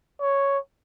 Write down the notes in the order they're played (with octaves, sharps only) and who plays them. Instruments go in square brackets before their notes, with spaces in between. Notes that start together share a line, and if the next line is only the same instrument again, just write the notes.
[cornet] C#5